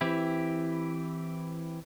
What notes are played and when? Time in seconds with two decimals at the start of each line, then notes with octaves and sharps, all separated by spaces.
0.01 E3 C4 E4 G4